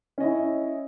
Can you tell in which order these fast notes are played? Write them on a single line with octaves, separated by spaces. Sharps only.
C#4 D#5 E4